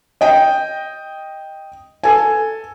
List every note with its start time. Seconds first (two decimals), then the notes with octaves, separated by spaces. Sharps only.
0.21 D#5 G5
2.04 A4 G#5